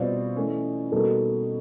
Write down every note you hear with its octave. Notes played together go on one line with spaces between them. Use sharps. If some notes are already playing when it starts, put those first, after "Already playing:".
Already playing: B2 G3 C4 F4 D5
E3 A3 C#4
B2 G3 A#3 D#4 F#4 A4